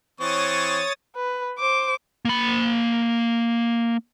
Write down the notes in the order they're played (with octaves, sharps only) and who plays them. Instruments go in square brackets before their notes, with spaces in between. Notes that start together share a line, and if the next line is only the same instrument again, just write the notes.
[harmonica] E3 C4 C#6 [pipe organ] C#5 D#6 A6
[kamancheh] B4
C5 D6
[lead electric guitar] A#3 B5